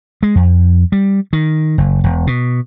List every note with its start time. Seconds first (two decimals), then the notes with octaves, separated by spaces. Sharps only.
0.23 G#3
0.35 F2
0.92 G3
1.33 D#3
1.78 F#1
2.04 E1
2.27 B2